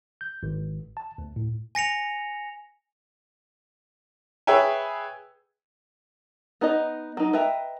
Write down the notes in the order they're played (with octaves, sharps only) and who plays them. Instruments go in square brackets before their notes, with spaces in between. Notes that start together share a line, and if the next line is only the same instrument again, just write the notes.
[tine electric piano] G6
G#1
A5
D2
A2
[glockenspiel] G#5 A#6 C#7 F7
[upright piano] G#4 B4 C#5 E5 G5 G#5
[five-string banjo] B3 D#4 B4 D#5 A#5
F#3 D#4
B4 D#5 E5 G5 A#5